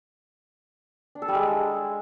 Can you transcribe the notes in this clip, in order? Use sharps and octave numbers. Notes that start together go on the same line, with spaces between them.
D4
A4
G3
G#3